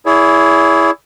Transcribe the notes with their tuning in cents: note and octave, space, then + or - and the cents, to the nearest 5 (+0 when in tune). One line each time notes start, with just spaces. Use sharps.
E4 +0 G#4 +5 C#5 +45